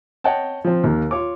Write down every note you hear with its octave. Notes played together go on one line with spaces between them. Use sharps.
C#5 D#5 F#5 G5 A5
F3 C4
D#2 A#3
F4 C#5 D6